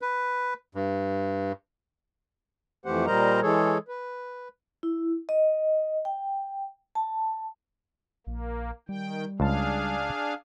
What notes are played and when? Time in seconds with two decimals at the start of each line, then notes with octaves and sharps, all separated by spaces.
0.01 B4
0.75 G2
2.86 F2 E3 A3 G4 C5 F#5
3.06 A#2 G3 A#4 C5 D#5 A#5
3.42 E3 G#3 G#4 A4 C#5
3.88 B4
4.83 E4
5.29 D#5
6.05 G5
6.95 A5
8.27 A#1 A#3
8.89 D#3 G3 G5
9.40 C#2 D4 G#4 F5 A5